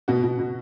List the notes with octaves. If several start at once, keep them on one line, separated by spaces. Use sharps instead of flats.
B2 F#4
B2
B2